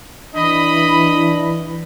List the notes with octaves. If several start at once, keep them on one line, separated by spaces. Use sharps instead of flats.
E3 D4 D#5 B5